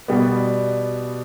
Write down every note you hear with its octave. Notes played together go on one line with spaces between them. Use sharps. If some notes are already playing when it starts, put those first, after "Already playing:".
B2 G3 B3